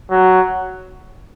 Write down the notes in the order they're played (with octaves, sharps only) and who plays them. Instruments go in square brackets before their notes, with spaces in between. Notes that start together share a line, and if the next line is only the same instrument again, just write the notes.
[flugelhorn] F#3